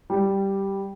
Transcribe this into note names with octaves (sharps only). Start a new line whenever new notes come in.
G3